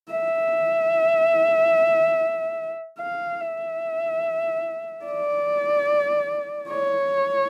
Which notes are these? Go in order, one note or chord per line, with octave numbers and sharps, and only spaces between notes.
E5
F5
E5
D5
C#5